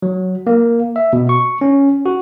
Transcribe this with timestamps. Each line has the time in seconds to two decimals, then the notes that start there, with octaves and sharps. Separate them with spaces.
0.02 F#3
0.47 A#3
0.96 E5
1.13 B2
1.29 C#6
1.61 C#4
2.06 F#4